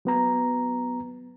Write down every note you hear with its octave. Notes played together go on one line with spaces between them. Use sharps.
F#3 B3 A#5